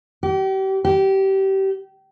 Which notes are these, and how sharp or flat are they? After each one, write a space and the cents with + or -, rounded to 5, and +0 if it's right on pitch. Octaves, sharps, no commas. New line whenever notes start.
G4 -35
G4 -25